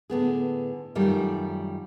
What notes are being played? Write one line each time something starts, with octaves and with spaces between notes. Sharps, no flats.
A2 D3 B3 G#4
F#2 D#3 G3 A3 F4